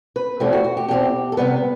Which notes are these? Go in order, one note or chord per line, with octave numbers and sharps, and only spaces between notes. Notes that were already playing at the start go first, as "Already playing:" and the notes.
B4
E2 B2 A3 C4 E4 G4
F#4
F#4
G4
E2 B2 A3 C4 E4 G4
A4
C3 G3 B3 B4